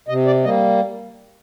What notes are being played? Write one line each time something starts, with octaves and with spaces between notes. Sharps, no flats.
C3 D#5
D5
G3 A#3 D#5